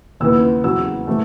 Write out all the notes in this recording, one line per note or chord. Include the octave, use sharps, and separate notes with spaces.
D#2 C#3 E3 B3 E6
E2 C#3 F#3 E6
C#3 E3 A3